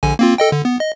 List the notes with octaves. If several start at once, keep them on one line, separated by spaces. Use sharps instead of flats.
A#1 D3 G#5
A#3 C4 F4
A4 D#5 G5
D3
B3
D#5